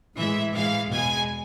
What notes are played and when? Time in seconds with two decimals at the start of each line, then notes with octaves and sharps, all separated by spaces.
0.17 A2 E3 G#3 E5
0.54 A2 E3 G#3 F5
0.91 E2 B2 G#3 G#5